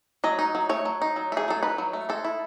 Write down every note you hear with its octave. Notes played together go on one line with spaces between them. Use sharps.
F#3 D#5
D#4
F#3
A3 C#5
F#3
D#4
F#3
A3 G#4
F#3 A4
D#4 B4
F#3
A3
G#3 A4
E4